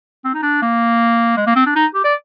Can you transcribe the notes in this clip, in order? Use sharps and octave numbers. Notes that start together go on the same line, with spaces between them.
C4
D#4
D4
A#3
G#3
A#3
C4
D4
D#4
G4
D5